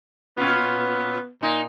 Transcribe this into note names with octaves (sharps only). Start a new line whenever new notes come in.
A#2 B3 C#4 F4
A#2 D#4